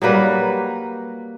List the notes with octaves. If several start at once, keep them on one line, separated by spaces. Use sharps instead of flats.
F#3 G3 A#3 B4